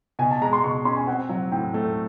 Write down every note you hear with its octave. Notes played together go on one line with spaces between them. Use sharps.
B2 G#5
A5
G#3 A#5
C6
B2 C#6
C#4 C6
G#5
C4 F#5
F#3
A2 G5
A3